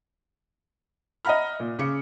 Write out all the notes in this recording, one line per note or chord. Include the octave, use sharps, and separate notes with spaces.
D#5 E5 F#5 A#5 B5 F6
A#2
C#3 D6 C#7